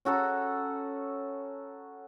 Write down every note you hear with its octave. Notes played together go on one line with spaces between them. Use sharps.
C#4 F#4 A4 A#5